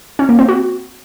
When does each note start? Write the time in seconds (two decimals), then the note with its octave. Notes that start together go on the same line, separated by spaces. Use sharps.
0.19 C#4
0.29 A#3
0.39 C4
0.49 F#4